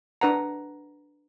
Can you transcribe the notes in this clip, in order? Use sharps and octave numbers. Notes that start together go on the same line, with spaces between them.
D4 B4 F#5 A#5